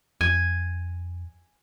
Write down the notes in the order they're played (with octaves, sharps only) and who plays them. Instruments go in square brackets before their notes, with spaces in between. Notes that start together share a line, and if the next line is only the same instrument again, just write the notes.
[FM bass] F2 [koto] G#5